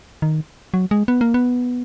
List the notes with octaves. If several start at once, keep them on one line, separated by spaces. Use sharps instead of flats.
D#3
F#3
G#3
B3
A#3
B3